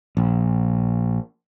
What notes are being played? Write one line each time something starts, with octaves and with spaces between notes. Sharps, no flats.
A#1